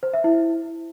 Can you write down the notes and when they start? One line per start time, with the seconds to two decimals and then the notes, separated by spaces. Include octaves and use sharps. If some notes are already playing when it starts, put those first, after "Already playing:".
0.03 C5
0.13 E5
0.24 E4